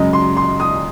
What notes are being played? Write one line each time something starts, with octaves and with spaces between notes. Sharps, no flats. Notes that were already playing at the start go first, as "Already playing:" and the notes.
Already playing: F#2 C#3 G#3 D#5
C6
C6
D#6